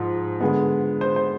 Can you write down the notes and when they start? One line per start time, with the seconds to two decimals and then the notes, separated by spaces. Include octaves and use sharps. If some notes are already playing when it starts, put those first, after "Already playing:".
Already playing: G#2 F3
0.41 D3 G#3 B3
1.01 C5
1.16 C5